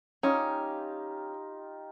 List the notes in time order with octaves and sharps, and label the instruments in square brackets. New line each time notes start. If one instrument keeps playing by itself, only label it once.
[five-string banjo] C#4 [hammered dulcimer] D#4 F4 G4